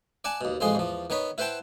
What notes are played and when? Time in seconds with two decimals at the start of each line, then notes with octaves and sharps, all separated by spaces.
0.24 D5 F#5 G#5 A5
0.41 D#2 B2
0.61 A1 F2 F3 G#3 G#4 C6
0.75 E2 F3
1.10 D#3 B3 C#5 B5
1.38 E4 B4 C5 F#5 G5 A5